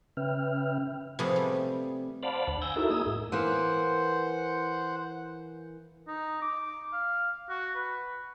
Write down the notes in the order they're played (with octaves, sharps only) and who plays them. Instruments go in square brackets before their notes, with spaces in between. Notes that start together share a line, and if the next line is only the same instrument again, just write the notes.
[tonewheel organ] C#3 C#4 B4 E5 G5 F6
[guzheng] C3 F3 A3 B3 G#4
G3
[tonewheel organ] C5 D5 F5 F#5 A5 B5
D2
G#5 E6 G6 A#6
D#4 E4 F#4 A4 A#4 E5
A#3 D#4 G#4 D#6 E6
G#2
[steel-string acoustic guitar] E3 A#3 [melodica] C5 F#5
[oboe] D#4
D6
F5
F#4
B4